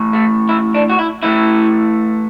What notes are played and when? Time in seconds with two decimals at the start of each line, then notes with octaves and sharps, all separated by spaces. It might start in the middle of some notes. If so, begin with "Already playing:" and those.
Already playing: A2 E3
0.13 A3
0.49 E4
0.74 D4
0.90 F#4
0.99 E4
1.23 A2 E3 A3 E4